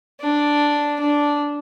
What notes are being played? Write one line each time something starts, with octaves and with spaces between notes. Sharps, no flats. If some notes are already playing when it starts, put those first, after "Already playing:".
D4
D4